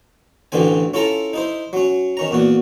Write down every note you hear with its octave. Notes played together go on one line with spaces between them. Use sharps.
A1 D2 D3 E3 C4 G#5
C#4 E4 F4 A4 A5 A#5
D#4 E4 C5
F#3 C#4
D#3 C#4 A#5
E2 A#2 F#4